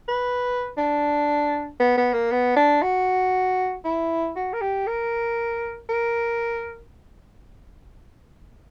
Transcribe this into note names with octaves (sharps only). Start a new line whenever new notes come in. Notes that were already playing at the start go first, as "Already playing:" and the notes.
B4
D4
B3
B3
A#3
B3
D4
F#4
E4
F#4
A#4
G4
A#4
A#4